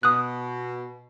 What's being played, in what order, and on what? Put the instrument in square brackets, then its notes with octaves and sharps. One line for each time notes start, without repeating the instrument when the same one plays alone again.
[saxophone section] B2 [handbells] D#6 F#6